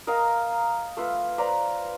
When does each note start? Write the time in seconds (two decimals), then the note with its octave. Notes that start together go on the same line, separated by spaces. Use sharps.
0.07 A#4 D#5 F5 A#5
0.97 A3 F4 B4
1.38 B4 C5 D5 A#5